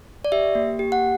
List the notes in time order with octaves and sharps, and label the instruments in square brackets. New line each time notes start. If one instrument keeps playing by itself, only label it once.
[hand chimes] D5
G4 E5
A#3
G4
F#5